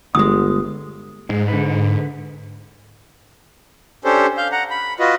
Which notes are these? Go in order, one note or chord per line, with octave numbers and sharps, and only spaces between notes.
G1 D2 G#3 D#6
G#2 G#3
D3 B4
C#4 D4 G4 A4 C5
F5 G6
F#5 A#5
B5
F4 F#4 B4 D#5